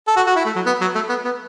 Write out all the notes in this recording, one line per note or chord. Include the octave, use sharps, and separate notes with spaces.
A4
F#4
F#4
E4
A3
F#3
B3
F#3
A3
B3
B3